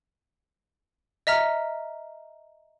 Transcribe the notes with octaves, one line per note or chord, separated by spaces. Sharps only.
D#5 E5 A#5 F6